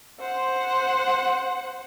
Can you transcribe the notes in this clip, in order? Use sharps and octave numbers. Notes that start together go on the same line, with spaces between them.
C5 F#5